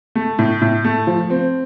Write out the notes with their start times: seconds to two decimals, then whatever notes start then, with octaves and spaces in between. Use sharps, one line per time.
0.15 A3
0.39 A2
0.62 A2
0.85 A3
1.07 F3
1.30 C4